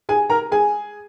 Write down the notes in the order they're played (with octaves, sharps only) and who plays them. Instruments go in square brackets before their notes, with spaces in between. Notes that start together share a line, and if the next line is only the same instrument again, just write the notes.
[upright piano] G#4 G#5
A#4 A#5
G#4 G#5